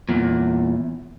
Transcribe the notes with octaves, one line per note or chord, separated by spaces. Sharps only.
E2 A#2